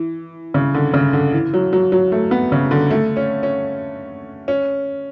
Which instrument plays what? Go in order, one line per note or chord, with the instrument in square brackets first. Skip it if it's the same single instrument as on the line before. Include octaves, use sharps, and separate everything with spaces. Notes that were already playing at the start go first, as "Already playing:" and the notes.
Already playing: [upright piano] E3
C#3
D3
C#3
D3
E3
F#3
F#3
F#3
A3
B3
C#3
D3
A3
C#4
C#4
C#4